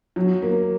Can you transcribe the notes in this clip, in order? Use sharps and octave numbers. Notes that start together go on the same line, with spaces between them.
F#3
A#3